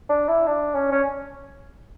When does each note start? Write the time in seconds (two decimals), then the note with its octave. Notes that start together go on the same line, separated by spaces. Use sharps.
0.09 D4
0.28 E4
0.47 D4
0.75 C#4
0.92 C#4